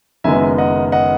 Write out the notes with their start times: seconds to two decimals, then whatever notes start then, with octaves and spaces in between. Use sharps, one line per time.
0.24 F#1 F#2 D#3 G#3 B3 E5 G#5
0.58 D#5 F#5
0.92 D#5 F#5